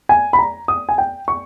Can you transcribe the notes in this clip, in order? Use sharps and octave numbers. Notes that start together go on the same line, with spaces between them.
G#5
B5
A#5
D#6
G#5
G5
C#6